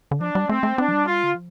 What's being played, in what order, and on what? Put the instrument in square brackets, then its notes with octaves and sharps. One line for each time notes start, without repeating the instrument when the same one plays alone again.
[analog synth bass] D3
[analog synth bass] F3 [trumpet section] D4
[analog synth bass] G3
[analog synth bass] A3 [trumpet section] C4
[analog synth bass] A3
[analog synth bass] C4 [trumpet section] D4
[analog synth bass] F3
G3
[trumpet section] F4
[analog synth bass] D3
F3